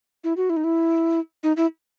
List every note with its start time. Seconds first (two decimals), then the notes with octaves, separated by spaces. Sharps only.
0.24 E4
0.37 F#4
0.50 E4
0.57 D#4
0.64 E4
1.43 D#4
1.57 E4